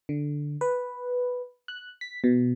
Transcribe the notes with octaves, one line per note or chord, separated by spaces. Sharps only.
D3
B4
F#6
B6
B2